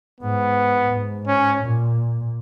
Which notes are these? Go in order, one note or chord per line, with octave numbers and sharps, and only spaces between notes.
G#2 B3
G#2
C#4
A#2